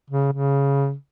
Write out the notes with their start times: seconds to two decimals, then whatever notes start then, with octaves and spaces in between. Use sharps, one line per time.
0.10 C#3
0.33 C#3